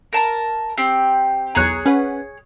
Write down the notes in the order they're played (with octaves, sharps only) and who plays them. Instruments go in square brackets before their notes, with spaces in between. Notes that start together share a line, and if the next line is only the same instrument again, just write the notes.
[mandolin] A#4 A5 A#5
C4 G4
[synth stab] B1 E2 A#5 [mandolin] G#4 C#5 F#6
[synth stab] C#4 B4 F#5